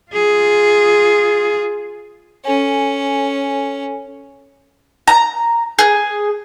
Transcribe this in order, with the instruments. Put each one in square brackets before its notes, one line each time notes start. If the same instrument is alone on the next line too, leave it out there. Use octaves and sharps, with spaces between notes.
[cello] F4 G#4
[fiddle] C#4 [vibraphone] A4 G#5
[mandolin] A#5
G#4